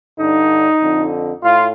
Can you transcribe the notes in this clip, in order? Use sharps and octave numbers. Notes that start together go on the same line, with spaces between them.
G2 D3 D#4
F2 D3
A2 F4